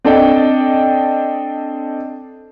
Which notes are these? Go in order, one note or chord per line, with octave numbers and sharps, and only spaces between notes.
C4 D4 A4 D#5 G5